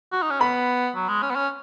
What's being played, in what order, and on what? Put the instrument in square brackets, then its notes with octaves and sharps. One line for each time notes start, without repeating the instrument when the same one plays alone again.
[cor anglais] F#4
D#4
C#4
[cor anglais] B3 [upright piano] B5
[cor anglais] F#3
G#3
C#4
B3
C#4